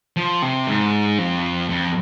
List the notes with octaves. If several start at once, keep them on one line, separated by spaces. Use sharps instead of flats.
F3
C3
G#2
F2
F2